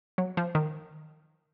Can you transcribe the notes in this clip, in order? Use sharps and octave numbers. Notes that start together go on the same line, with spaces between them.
F#3
F3
D#3